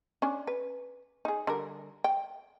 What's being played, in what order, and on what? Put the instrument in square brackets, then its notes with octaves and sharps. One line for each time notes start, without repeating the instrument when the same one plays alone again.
[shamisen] C#4 D4
B4
D#4 G#4
D3 G3 A#4
G5